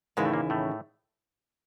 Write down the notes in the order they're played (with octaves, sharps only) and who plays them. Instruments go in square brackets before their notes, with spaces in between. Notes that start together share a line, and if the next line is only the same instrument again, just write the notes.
[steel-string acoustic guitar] D#2 C#3 E3 [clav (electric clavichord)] G#2 G#3
[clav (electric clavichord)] A2 A3
A#2 A#3
A2 A3